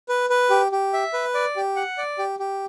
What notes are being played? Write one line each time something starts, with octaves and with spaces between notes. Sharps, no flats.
B4
B4
G4
G4
E5
B4
D5
G4
F#5
D5
G4
G4